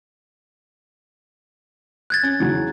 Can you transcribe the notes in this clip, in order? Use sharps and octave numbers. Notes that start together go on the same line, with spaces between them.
F#6 G#6 A6
C#4
E2 C#3 F#3